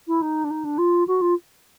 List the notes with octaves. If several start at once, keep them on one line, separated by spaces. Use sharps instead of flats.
E4
D#4
D4
D#4
D4
F4
F#4
F4